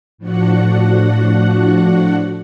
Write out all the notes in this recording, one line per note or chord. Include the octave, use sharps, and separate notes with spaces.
A2 F3 D4 F#4 F#5